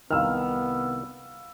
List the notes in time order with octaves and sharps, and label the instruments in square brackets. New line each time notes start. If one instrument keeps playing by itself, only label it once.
[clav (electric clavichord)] C2 D#3 [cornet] B3 [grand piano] F5 E6 F6